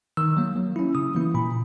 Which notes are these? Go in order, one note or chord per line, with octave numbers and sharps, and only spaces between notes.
D#3 E6
F#3 A#3
F#3
C#4 E4
C#3 D#6
E3 A#3 E4
A#2 B5